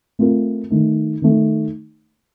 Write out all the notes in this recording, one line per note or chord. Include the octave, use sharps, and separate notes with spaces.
A3 C4 F4 A#4
D#3 A3 D#4
D#3 A3 D#4